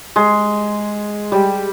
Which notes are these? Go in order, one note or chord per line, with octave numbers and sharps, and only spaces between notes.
G#3
G3